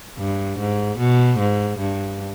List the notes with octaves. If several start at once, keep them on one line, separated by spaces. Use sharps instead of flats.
G2
G#2
B2
G#2
G2